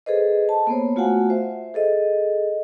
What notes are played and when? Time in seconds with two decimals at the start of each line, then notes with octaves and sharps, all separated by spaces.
0.06 G#4 A4 B4 C5 D#5
0.49 A5
0.67 A#3 B3 C5 C#5
0.96 A3 F4 F#4 F5 F#5 G#5
1.30 C5 E5
1.74 G#4 A4 D#5